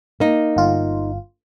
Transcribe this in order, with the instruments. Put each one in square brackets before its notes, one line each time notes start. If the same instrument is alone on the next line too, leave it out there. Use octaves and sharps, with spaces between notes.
[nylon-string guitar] A#3 D#4
[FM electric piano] G1 F4